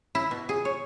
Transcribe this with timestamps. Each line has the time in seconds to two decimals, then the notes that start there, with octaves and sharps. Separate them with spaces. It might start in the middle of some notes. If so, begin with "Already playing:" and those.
0.15 E4
0.31 B2
0.49 G#4
0.65 C#5